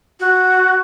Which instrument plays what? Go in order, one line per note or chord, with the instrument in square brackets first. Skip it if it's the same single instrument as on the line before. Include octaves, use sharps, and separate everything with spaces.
[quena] F#4